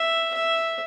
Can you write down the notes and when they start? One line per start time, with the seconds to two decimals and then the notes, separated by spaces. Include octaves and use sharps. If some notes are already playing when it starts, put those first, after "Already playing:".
Already playing: E5
0.34 E5